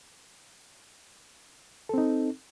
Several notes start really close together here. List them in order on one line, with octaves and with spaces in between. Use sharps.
A4 C4 D#4